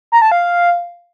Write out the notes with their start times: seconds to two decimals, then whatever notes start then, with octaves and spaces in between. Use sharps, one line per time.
0.12 A#5
0.22 A5
0.32 F5